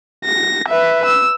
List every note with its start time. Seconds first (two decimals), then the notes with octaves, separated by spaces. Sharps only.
0.25 A#6
0.69 B4 E5
1.06 E6